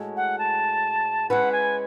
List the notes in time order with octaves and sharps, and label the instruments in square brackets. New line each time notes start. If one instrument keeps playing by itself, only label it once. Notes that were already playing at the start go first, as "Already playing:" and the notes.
Already playing: [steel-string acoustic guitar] A2 G#3 C#4 F#4 A4
[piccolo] F#5
A5
[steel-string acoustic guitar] G#3 C#4 E4 B4 [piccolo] F#5
[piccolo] G#5